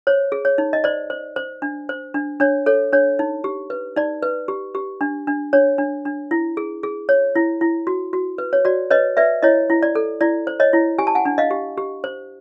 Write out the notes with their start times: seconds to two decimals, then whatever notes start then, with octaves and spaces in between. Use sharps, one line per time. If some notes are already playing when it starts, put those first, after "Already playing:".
0.07 C5 C#5
0.32 G#4
0.45 C#5
0.58 D#4
0.73 D#5
0.84 C5 D5
1.10 C5
1.36 C5
1.62 D4
1.89 C5
2.14 D4
2.40 D4 C#5
2.66 A4 C#5
2.92 D4 C#5
3.19 D#4
3.44 G4
3.70 B4
3.96 D#4 D5
4.22 B4
4.48 G4
4.75 G4
5.01 D4
5.27 D4
5.53 D4 C#5
5.78 D4
6.05 D4
6.31 E4
6.57 G#4
6.83 G#4
7.09 C#5
7.35 E4
7.61 E4
7.87 F#4
8.13 F#4
8.38 B4
8.53 C#5
8.65 F#4 D5
8.90 B4 C#5 D#5
9.17 B4 D5 E5
9.42 E4 C#5 D#5
9.70 E4
9.82 D5
9.95 A4
10.21 E4 D5
10.47 C5
10.60 C#5 D#5
10.73 E4
10.99 G4 G#5
11.07 A5
11.15 F#5 G#5
11.25 D4
11.38 D#5 F5
11.51 G4
11.78 G4
12.04 C5